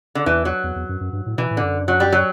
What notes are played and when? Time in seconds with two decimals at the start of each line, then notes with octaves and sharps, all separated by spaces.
0.15 D3
0.26 E2 E3
0.45 F#3
0.64 E2
0.76 E2
0.89 F#2
1.01 F#2
1.13 G2
1.26 A2
1.38 B2 E3
1.51 A2
1.57 D3
1.63 F#2
1.88 F#3
2.00 G3
2.12 F#3